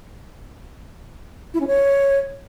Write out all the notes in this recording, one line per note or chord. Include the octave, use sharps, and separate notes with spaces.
E4
C#4
C#5